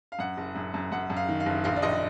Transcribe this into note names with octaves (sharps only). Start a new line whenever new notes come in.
F5
F#2 F#5
F#1
F#2
F#2
F#2 F#5
F#2
F5
D#3
F5
F#1
A#1 F5
D5
A#1 D#5